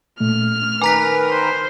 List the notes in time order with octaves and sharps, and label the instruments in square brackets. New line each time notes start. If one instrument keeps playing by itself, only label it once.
[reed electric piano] A#2 A3 [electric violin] F6
[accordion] D#3 A#4 B4 [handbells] G#5 A#5 B6 [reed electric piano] D6
[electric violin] C5